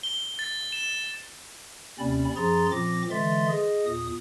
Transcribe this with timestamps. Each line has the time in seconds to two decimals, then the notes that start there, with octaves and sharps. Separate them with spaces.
0.03 G7
0.39 A6
0.73 E7
1.99 D#2 C3 C4 C#4 D5 B5
2.36 F#2 F3 G#4 A#5 C6 A6
2.71 A#2 F3 C4 D6 A#6
3.11 D3 E3 G#3 E5 C6 A6
3.48 G#4 D#5
3.86 E2 A#2 D#6